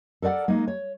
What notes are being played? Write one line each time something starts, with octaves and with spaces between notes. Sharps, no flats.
A4 A#4 D5 F#5
G#3 A#3 D#4
C#5